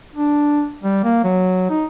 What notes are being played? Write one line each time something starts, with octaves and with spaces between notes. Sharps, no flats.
D4
G3
A#3
F#3
D#4